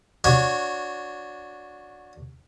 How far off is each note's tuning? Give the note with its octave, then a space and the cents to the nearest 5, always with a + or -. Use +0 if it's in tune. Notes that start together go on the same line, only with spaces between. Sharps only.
D4 +0 F#4 -20 C#5 +0